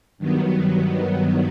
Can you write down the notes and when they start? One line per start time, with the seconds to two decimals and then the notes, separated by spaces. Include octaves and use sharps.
0.18 G2 D#3 F#3 B3